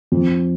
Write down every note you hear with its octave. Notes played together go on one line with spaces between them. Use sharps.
F2